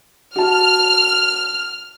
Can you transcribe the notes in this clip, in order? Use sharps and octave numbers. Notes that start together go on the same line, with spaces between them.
F#4 A5 F6